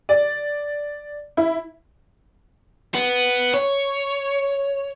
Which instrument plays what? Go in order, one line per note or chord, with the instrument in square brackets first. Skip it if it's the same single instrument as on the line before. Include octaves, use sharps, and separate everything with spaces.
[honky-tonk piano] D5
E4
[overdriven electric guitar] B3
C#5